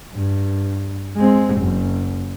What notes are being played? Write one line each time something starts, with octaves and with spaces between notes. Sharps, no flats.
G2
G#3 C4
F#1 F#2